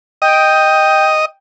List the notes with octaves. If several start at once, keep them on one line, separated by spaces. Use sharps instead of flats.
D#5 G5